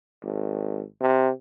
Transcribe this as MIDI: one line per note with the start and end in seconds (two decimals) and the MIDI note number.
0.23 0.82 32
1.01 1.29 48